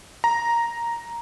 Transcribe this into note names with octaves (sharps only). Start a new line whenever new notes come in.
A#5